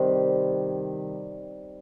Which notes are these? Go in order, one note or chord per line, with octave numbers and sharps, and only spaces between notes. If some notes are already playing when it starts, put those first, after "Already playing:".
Already playing: C3 D#3 G3